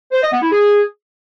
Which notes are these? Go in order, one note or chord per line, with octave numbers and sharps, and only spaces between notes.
C5
D#5
B3
E4
G#4